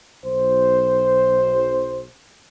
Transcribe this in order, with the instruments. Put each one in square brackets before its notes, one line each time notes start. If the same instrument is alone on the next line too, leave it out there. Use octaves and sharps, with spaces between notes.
[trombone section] B1 C5